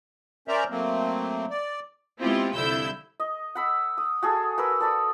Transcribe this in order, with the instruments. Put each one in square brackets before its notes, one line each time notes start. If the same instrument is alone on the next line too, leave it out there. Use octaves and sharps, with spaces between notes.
[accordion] C#4 A#4 C5 D5 E5 A#5
F#3 A3 A#3 C4
D5
[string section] G#3 B3 C4 E4 F4 G4
C2 F2 D3 E4 E6 G6
[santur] D#5
F#5 B5 E6
D#6
F#4 G#4 A4
F#4 A#4 B4 E6
A4 D5 B5 D#6